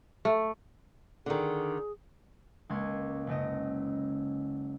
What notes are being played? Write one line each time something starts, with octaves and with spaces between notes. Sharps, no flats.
A3
D3 D#3 G#4
C#2 G#3 A#3 C6 C#6 G#6
F#1 C#3 D#5